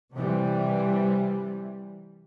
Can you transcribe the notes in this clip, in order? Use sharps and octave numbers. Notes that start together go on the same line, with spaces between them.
C3 E3 G3